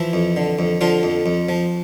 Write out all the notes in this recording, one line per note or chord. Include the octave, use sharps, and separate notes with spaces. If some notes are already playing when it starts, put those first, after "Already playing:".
Already playing: E3 F3 E4
F2
D3
F2
D3 F3 F4
F2
F2
F3